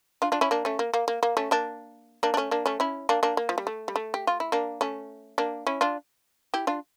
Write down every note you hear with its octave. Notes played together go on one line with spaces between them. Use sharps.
D4 F4
D4 F4
C#4 E4
A#3 D4
A3 C#4
A#3
A#3
A#3
A#3
A3 C#4
A#3 D4
A#3 D4
D4
A3 C#4
A#3 D4
A3 C#4
C#4 E4
A#3 D4
A#3 D4
A#3
F3
G3
A3
G3
A3
G4
F4
E4
A#3 D4
A3 C#4
A#3 D4
C#4 E4
D4 F4
E4 G4
D4 F4